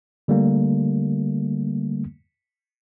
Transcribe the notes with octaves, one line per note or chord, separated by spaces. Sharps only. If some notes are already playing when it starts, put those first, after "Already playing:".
D3 G3 A3 A#3